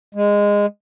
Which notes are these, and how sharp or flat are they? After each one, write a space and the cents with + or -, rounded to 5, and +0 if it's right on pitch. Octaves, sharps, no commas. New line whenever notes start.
G#3 -15